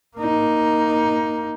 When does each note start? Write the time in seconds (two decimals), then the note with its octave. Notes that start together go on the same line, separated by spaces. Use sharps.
0.17 A#3 D#4